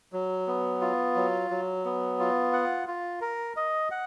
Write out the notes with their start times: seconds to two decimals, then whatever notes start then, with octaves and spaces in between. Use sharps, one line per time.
0.13 F#3
0.47 B3
0.81 F4
1.16 F#3
1.50 F#3
1.85 B3
2.19 F4
2.53 F#5
2.88 F4
3.21 A#4
3.57 D#5
3.91 F#5